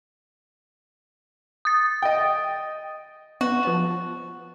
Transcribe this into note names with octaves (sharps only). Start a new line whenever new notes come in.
D#6 A6
D#5 G5
B3 F#4
F3 B3 A5